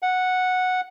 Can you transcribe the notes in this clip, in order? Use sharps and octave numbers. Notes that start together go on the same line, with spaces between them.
F#5